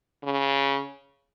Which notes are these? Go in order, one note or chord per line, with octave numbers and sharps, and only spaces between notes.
C#3